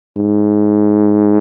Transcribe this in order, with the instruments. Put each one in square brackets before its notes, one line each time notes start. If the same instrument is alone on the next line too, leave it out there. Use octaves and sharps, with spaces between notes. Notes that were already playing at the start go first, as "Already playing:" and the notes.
[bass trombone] G#2